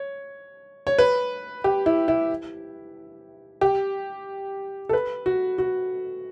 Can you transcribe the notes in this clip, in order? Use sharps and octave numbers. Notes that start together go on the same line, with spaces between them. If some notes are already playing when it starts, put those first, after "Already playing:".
Already playing: C#5
C#5
B4
G4
E4
E4
G4
A4
B4
F#4
F#4